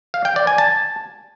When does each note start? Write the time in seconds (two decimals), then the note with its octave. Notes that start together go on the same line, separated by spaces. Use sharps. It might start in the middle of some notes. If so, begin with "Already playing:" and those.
0.14 F5
0.25 G5
0.36 D5
0.47 G#5
0.58 A5